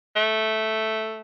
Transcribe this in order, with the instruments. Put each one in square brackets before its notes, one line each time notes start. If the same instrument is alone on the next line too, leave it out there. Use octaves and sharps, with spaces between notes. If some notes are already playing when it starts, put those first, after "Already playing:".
[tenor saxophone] A3